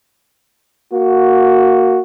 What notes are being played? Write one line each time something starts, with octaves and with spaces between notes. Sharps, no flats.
A#3 F#4